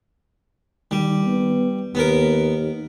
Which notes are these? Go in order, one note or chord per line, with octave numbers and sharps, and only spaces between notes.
D#3 G3
B3
D#2 B3 A#4